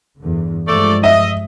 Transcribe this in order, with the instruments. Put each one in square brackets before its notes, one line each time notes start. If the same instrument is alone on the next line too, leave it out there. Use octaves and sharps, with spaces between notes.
[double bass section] E2 G2 D3
[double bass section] G2 F3 G#3 [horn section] A3 A4 D5
[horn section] D#5 [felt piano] E5